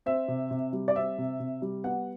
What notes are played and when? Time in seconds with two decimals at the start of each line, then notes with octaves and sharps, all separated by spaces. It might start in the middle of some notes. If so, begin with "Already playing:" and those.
0.06 C4 E5
0.28 C3
0.51 C3
0.73 G3
0.88 D5
0.96 C4 E5
1.18 C3
1.40 C3
1.62 G3
1.84 B3 F#5